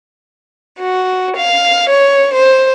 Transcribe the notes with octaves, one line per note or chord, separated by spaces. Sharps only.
F#4
F5
C#5
C5